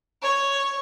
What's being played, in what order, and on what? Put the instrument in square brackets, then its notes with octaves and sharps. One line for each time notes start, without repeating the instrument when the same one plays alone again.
[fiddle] C#5